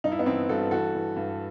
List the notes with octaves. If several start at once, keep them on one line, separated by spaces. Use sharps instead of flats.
G2 D#4
E4
B3 D#4
E3 C4 E4
G2 F#4 A4
E3 F#4 A4
E3
G2